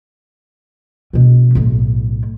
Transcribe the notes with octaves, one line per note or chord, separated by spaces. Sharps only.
B2 C#4
B1 A2